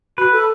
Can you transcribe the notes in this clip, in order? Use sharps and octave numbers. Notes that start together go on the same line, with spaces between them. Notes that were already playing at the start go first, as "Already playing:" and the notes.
F#4 B4
A4